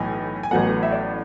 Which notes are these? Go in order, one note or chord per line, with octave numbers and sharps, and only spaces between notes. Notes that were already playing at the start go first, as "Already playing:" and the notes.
Already playing: B1 A2 E3 B3 G#5
G#5
A1 A2 F#3 B3 F#5
E5
D5